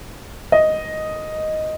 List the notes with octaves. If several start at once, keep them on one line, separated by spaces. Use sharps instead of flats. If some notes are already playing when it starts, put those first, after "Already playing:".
D#5